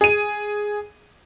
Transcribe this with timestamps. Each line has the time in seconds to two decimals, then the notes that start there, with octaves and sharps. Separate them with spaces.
0.01 G#4 D#7